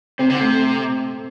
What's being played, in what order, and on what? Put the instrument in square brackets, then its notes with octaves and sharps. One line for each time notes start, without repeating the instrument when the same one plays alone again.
[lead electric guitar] C3 [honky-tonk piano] C4
[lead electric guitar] D3
[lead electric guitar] C3 [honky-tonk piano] A3